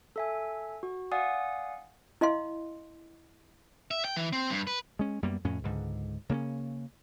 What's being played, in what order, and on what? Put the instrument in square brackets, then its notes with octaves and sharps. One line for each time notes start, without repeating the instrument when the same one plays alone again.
[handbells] A4 E5 G#5
F#4
D5 F5 F#5 G#5 D#6
[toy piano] E4 D#5 F5 C6
[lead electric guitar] E5
G5
E3
C4
G2
B4
[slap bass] G#3 C#4
F#2 G3 A#3 B3
F2 A2 C#4
C#2 G#2 D3
C#3 A#3 B3 C#4